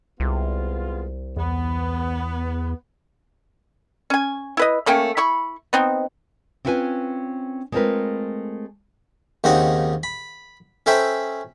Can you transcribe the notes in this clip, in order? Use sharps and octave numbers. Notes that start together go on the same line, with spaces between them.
C2 G#3 B3 F4
E2 B3
C#4 G#5
E4 B4 D#5
A3 A#3 C#4 G5
E4 B5 C#6
B3 C4 D#4
C4 C#4 E4 F4 B4 G#5
G#3 A3 C4 F4 A#4 B4
D#2 C#3 C4 D#4 F#5
B5
C#4 A4 C5 E5 G5 B5